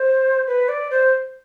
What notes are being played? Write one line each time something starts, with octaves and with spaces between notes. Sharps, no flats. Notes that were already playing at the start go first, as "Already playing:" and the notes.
Already playing: C5
B4
D5
C5